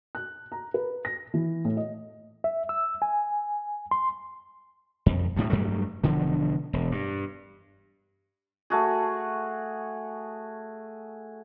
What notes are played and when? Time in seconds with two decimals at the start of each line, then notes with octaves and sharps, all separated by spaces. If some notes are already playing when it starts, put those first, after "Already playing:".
0.15 F#6
0.52 A#5
0.74 B4
1.05 A#6
1.34 E3
1.65 A2
1.77 D#5
2.44 E5
2.69 E6
3.02 G#5
3.91 C6
5.06 F2
5.36 D2 A2 G3
5.50 G2 F#3 G3 A3
6.04 E1 D3 F3
6.73 E1
6.92 G2
8.70 A3 F#4 G#4